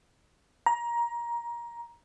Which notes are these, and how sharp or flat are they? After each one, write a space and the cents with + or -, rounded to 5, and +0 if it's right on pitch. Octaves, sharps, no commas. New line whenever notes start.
A#5 +20